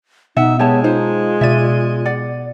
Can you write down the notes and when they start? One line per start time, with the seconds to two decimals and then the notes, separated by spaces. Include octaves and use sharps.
0.37 B2 D#4 E5 F#5
0.59 G#3 B3 G4 C#5 A5
0.84 D#4 F4 C5
1.41 B2 D5 E5 D#7
2.05 D5 F#5